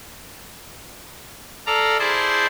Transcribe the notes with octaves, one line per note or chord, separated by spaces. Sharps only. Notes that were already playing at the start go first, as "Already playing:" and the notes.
A4 D5 F5 A#5
E4 G#4 C5 D5 A5 G6